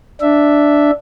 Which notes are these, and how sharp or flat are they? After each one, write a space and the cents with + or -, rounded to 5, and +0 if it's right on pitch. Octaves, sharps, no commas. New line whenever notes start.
D4 +0 E5 +0